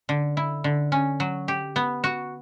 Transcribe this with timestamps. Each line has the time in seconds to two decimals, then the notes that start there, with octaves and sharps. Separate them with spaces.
0.09 D3
0.37 E4
0.64 D3
0.92 C#4
1.20 F#3
1.48 G4
1.76 B3
2.04 F#4